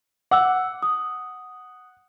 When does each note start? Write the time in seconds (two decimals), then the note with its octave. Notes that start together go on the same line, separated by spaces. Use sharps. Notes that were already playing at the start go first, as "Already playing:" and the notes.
0.31 F#5 D6 E6
0.83 D#6